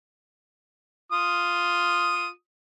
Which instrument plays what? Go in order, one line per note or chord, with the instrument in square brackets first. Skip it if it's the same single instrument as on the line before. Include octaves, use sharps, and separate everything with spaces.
[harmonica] F4 D#6